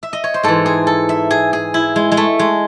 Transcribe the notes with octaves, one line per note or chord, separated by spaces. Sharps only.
E5
D#5
C#5
C5
G#2 E3 A4
G#4
A4
E5
G#4
G#4
E4
G#3
G#3
A3
G#3